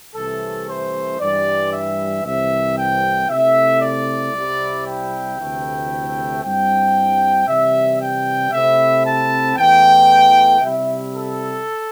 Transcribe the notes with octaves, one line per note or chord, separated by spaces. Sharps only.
C2 C3 E3 A3 A4
C5
G2 E3 G3 D5
E5
C2 C3 E3 E5
G5
C3 A3 E4 E5
D5
C2 C3 G3 E4
G5
D2 C3 E3 A3 E4
G2 G3 C4 E4 G5
C3 E3 G3 E5
G5
C3 A3 C4 E4 E5
A5
E2 E3 A3 G5
C3 G3 E4 E5
A4